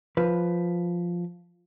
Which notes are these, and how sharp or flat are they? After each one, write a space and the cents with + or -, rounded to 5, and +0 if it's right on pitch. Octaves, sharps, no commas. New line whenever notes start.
F3 +0 B4 +0